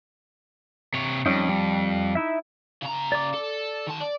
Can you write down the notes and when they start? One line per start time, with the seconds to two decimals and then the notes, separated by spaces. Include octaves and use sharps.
0.94 C3 C#5
1.26 F2 G3 C#4 D#4
1.49 G3
2.15 D#4 E4 E5
2.83 C#3 A#5
3.12 D5 D6
3.34 A4
3.87 D#3 A5
4.00 D5